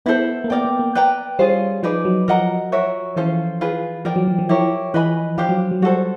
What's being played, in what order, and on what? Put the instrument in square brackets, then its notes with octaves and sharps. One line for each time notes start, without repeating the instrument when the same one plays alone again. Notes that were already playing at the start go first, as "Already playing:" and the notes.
[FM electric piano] B3 [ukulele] E4 A4 C5
[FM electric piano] A#3
[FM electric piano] B3 [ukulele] A#4 D5 G5
[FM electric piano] B3
A#3
[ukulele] B4 D5 G5 A#5
[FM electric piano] G3 [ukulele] C#4 F4 G#4 C5
[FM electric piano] F3 [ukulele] D#4 G#4 B4 D5
[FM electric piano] F#3
[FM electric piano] F3 [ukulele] A#4 D#5 F#5 A#5
[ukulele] F#4 A#4 C#5 E5
[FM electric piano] E3 [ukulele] C#4 F4 A4 C5
[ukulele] F4 G#4 B4
[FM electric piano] F3 [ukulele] A#4 D5 G5
[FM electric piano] F#3
F3
F3
[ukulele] E4 G4 A#4 C#5
[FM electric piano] E3 [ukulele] B4 D#5 G#5 B5
[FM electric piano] F3 [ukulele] D4 G4 C5 F5
[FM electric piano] F#3
F#3
[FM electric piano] G3 [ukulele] F#4 A4 C5